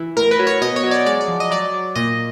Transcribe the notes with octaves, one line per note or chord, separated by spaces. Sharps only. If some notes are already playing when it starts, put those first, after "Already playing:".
Already playing: E3
A2 A#4
B4
F#3
C#5
B2 D#5
C#5
F#3
D5
G#3 D5
D5
F3
D#5
F#3 D5
F#3
A#2 D#5